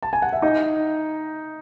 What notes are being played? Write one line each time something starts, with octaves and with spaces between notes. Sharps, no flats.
A5
G#5
F#5
E5
D#4 D#5